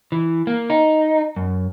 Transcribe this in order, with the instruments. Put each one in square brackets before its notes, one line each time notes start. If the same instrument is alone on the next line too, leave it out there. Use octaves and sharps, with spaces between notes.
[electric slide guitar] E3
A#3
D#4
F#2